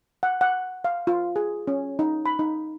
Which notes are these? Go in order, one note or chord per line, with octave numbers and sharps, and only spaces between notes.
F#5
F#5
F5
F4
G#4
C#4
D#4
B5
D#4